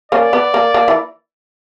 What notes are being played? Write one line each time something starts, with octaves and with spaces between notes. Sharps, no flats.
A#3 C#4 D5
B3
A#3
A#3
E3